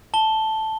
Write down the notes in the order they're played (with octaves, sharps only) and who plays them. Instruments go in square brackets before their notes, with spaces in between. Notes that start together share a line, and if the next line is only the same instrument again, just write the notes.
[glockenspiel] A5 G7